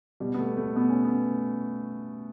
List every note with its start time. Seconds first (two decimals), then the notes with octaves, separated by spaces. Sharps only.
0.20 B2 G3
0.34 B3
0.39 A3
0.57 A3
0.76 B2 B3
0.90 C#4
1.05 B3